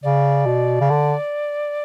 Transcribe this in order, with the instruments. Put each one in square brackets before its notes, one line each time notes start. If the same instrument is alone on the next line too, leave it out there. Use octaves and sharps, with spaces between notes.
[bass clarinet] C#3 [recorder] D5
[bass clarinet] B2
C#3
D3